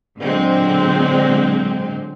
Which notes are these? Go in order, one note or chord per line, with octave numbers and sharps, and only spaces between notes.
A#2 D3 F#3 G#3 C4